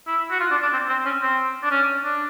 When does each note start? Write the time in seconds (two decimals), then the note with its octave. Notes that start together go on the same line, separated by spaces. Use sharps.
0.07 E4
0.31 F#4
0.40 F4
0.51 D4
0.62 D4
0.73 C4
0.89 C4
1.06 C#4
1.22 C4
1.63 D4
1.71 C#4
2.04 D4